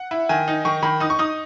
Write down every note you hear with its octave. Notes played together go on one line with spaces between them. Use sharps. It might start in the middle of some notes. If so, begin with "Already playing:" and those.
Already playing: F#5
E4
D#3 G#5
D#4
D#3 C#6
D#3 B5
D#4 D#6
C#6
D#4 D#6